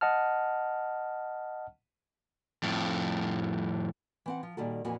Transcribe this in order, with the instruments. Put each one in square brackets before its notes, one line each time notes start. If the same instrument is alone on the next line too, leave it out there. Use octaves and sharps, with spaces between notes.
[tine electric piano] D#5 F#5 A5 F6
[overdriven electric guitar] F2 A2
[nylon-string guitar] E3 C4 F#5
F3
A#2 D#3 G3 F#4 A4
F2 A#2 E3 A#3 F#4 G#5